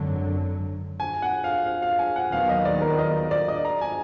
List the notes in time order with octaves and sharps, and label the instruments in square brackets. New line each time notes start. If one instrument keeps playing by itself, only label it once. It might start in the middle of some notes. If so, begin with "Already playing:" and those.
Already playing: [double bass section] G#1 F#2 D3 F#3
[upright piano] G#5
F#5
F5
F5
F5
G#5
F#5
[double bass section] D#2 D#3 F#3 B3 [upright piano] F5
[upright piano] D#5
D5
A#4
D#5
D5
D#5
A#5
G#5